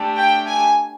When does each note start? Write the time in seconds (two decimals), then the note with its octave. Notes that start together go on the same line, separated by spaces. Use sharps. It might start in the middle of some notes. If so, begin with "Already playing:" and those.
Already playing: A3 D4 G4
0.17 G5
0.48 G#5